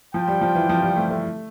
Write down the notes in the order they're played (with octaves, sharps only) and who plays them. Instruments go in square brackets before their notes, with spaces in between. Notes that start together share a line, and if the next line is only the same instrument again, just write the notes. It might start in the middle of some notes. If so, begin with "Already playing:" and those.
[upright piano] F3 [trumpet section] F4 C5 G5
[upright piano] G3
F3
E3
F3
G3
A3
A3